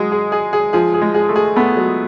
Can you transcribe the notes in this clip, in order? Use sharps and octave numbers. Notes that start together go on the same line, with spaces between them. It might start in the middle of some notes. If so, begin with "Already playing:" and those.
Already playing: F#3 G#3 G#4
G#4
G#4
G#4
F3 G#4
G#4
G#3
G#4
A3
G#4
A3 B3
F#3